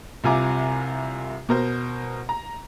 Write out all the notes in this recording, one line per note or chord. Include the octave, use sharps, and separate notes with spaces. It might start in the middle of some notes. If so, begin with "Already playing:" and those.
C2 C3 F4 G#5 A#5 D6
B2 A#4 C5
A#5